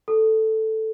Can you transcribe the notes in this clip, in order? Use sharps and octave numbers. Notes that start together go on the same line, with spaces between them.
A4